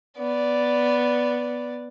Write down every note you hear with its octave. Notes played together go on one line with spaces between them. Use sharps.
B3 D5